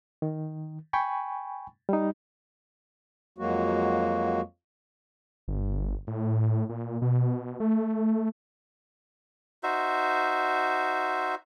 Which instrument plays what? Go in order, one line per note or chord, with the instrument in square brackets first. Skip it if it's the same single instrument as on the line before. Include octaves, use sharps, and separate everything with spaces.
[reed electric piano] D#3
G5 G#5 B5 C#6
G3 D#4
[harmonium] F2 F#3 G#3 A#3 F#4
[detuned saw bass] G1
A2
A#2
B2
A3
[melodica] D#4 F#4 C5 E5